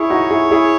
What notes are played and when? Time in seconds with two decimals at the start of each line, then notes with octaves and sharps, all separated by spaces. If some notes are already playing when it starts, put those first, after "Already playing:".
Already playing: E4 G#4 C#5
0.10 D#4 F#4
0.31 E4 G#4
0.51 E4 G#4